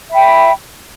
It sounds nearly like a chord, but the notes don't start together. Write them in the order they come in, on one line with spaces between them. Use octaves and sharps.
E5 B5 G5